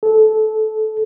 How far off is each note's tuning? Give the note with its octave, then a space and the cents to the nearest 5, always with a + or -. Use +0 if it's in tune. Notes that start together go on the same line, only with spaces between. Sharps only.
A4 -20